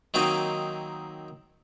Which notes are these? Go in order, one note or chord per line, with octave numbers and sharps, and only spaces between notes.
D#3 F#3 A#3 C4 D#4